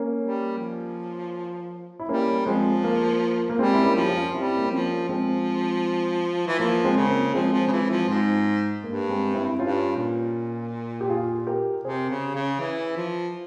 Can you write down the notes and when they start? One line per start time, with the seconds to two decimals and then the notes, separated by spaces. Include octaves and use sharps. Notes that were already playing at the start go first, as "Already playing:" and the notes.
Already playing: A#3 C#4
0.21 G3
0.58 F3
1.99 E4
2.08 G3 A#3 C#4
2.46 F3 G#3 C4
2.84 A#3
3.49 A#3
3.59 G3 G#3 C4
3.73 E4
3.84 A#3 C#4
3.96 F3 G4
4.09 C#4 F4
4.34 G3 C4 E4
4.56 A#3
4.64 C4
4.71 F3 A#3 C#4
5.08 F3 G#3 C4
6.47 E3
6.59 F3 A#3
6.84 G#3 C4
6.96 C#3 C4
7.09 A#3
7.34 F3 G#3 C4
7.53 F3
7.68 C#3
7.72 E3
7.90 F3
8.09 G#2
8.84 G2 A#3
9.09 G#3 C4
9.34 C4 E4
9.59 G2 C#4 F4
9.97 A#2
11.01 G4
11.09 F4 G#4
11.47 G4 A#4
11.84 C3 G#4 C5
12.10 C#3
12.35 C#3
12.60 E3
12.96 F3